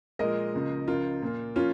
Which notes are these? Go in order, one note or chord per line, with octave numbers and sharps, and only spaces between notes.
A#2 F3 G#3 A#4 D#5
C#2 C#3 F3 A#3
C#2 C#3 F3 F4 A#4
A#2 A#3
F3 A#3 C#4 F4